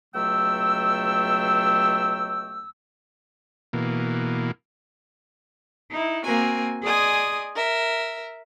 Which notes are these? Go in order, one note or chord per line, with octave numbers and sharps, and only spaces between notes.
C#2 B2 F#3 A3 G5 E6
B2 E3 A#3
D#4 E4
A#3 C4 F#4 A#4 G#5
G#4 D5 D#5 G#5 C6 D#6
A#4 E5